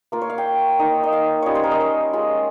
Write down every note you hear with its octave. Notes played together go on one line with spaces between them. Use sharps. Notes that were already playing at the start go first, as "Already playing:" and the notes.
A#3 F4 A#4
C#5
F5
G5
A#3 D#4
D#5
F5
G3 C#4 F4 C#5 D#5
C5
A#4
D#5
C#5
G#3 C#4 F4